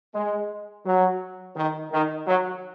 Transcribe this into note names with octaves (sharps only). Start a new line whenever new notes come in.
G#3
F#3
D#3
D#3
F#3